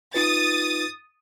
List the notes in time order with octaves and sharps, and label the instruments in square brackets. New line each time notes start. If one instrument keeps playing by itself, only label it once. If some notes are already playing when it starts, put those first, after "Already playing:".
[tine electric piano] D#4 F4 B4 [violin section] D#6 A6